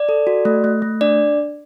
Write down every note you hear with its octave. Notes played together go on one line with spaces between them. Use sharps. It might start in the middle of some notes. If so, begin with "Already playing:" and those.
Already playing: D5
A4
F#4
A3
A3
A3
D4 D5